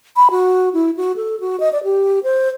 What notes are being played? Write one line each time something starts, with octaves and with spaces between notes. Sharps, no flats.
B5
F#4
E4
F#4
A4
F#4
D#5
D5
G4
C5